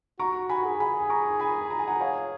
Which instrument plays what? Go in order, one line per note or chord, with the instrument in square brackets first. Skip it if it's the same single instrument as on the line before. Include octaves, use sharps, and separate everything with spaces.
[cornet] F#4 [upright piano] A#5 C#6
[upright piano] G#5 B5
[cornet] G#4
[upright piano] G#5 B5
A#5 C#6
G#5 B5
A#5
G#5
F#5 A#5
C#5 F5